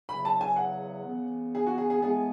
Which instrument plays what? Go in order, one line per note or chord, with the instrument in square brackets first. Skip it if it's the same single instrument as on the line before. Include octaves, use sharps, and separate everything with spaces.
[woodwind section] E2 C#3 F#3 [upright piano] B5
[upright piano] A5
G#5
F#5
[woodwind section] C#3 E3 B3
[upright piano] G#4
F#4
G#4
G#4
[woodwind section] A2 E3 G#3 B3 [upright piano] G#4